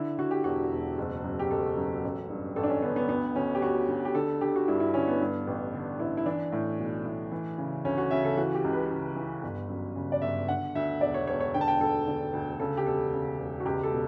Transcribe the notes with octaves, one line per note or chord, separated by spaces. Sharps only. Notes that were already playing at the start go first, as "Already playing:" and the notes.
Already playing: D3 E4
D3 F#4
G4
E1 F#4
E1
F#1
F#2
G4
F#1 A4
F#2
A1
G2
A1 A4
D4
C#4
D3 B3
B3
D2 B3
D2 C#4
G4
D2 F#4
D2
G4
D3 A4
D3 G4
F#4
G2 E4
E4
D3 C#4
B3
G2
A1
D3 D4
A1 E4
E4
E3 D4
A2
B1
A2
E3
C#3
D2 C#4
F#4
C#3 E5
A4
E3 F#4
G4
C#2
B4
C#2
E3
G1
F#2
C#3
D5
G1 E5
D3 F#5
D2 E5
E1 D5
C#5
E1 C#5
C#5
D3 G5
A5
G5
D2 A4
D3
D2
C#3 A4
G4
E1 A4
C#3
E1
F#4
C#2 G4
A4
B2